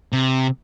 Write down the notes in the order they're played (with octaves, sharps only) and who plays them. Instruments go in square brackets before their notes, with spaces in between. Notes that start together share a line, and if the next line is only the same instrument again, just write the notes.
[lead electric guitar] C3